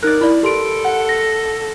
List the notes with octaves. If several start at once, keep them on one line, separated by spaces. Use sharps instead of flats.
D#4 A#4 D5 F#6
E4 D5 B5
G4 A4 C6 D7
F#5
A#6